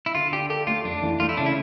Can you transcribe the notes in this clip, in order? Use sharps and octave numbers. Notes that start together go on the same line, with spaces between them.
E4
D3 F4
D4 G4
G4 A4
A3 F4
F2 D4
E3
A3 F4
E4
C#3 D4
E4